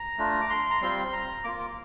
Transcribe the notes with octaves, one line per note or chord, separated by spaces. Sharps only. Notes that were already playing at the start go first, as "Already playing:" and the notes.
Already playing: A#5
A3 D4 F4
D6
C6
A#5
G3 C4 F4 C6
A#5
A#3 F4 D6